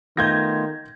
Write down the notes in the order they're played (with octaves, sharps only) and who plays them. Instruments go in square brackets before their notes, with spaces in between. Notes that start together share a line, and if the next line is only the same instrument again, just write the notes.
[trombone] D#3 [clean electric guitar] A3 B3 F4 [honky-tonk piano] G6 G#6 A#6